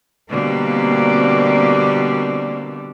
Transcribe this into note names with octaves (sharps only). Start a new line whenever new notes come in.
B2 D3 G3 A#3 C4